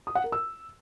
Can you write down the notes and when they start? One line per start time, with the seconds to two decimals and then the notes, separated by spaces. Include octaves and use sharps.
0.07 D#6
0.15 F#5
0.24 A#4
0.32 E6